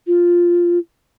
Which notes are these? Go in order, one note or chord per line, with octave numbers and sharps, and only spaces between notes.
F4